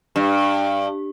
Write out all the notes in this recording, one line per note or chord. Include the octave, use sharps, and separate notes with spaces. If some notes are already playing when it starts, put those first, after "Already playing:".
G2